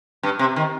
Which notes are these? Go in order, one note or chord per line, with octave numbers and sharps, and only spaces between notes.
G2
C3
D#3